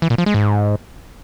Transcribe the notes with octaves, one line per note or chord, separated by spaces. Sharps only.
E3
A#2
F3
G#3
G#2